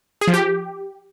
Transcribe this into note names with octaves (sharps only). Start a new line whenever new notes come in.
G#4
F3
G4